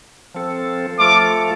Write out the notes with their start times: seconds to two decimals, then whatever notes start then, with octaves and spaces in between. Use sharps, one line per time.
0.34 F3 C4 A4
0.99 F3 A3 F4 A4 D6